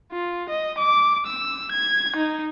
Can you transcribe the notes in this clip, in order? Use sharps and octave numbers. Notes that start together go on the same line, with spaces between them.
F4
D#5
D6
E6
G#6
D#4